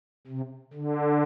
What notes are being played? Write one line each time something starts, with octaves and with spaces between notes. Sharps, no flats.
C3
D3